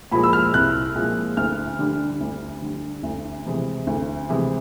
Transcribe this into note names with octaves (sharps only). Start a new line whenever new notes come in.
A#2 F3 G#3 B5
E6
F6
C2 F#6
A#2 F3 G#3
D2 F6
D3 G3
D2
D3 G3
D2
C3 E3 G#3
D2
C3 E3 G#3